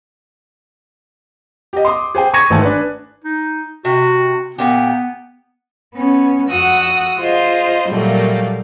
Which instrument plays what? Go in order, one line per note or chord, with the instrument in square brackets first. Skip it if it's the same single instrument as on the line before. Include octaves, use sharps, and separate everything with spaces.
[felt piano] G4 D#5
C6 D6 D#6
G#4 C5 G5 G#5
C#6 G#6 A#6 C#7 D#7
G#1 D#3 A3 G#5 A5
D4 B4
[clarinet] D#4
[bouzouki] C3 [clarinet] F#4
[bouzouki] A#2 G4 [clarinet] B3
[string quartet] B3 C#4
F2 F#4 F#5 D#6 E6
F4 G#4 C5 D#5
A#2 F#3 G3 A3 A#3